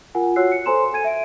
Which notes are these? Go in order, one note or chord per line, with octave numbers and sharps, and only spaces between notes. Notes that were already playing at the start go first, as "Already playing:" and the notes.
F4 A#4 F#5 G#5
F#4 C#5 F#5 E6 F#6 C7
C#7
A4 C5 G#5 A#5 C6 E7
A4 G#5 G#6 D#7
E5 D7